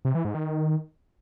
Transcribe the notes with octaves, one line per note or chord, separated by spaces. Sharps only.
C3
E3
G#2
D#3